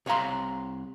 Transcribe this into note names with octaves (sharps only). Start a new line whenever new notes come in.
C2 C#5 F5 A#5 C6